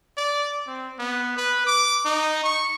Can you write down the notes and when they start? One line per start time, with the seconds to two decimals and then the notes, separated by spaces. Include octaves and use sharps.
0.17 D5
0.67 C4
0.99 B3
1.37 B4
1.66 D6
2.05 D#4
2.44 C#6